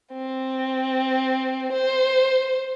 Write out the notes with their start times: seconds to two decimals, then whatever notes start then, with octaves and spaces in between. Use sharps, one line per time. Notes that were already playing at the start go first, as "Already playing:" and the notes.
0.13 C4
1.73 C5